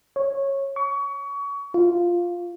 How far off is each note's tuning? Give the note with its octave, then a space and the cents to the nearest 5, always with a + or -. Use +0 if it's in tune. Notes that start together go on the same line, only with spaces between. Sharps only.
C#5 -15
C#6 +30
F4 +0